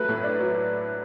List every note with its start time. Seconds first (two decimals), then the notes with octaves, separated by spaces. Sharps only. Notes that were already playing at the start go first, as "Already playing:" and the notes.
Already playing: F#3 A3 B4
0.09 A2
0.24 D4
0.39 F#3